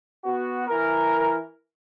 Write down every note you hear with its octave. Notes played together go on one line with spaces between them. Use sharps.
B3 F#4
E3 A#4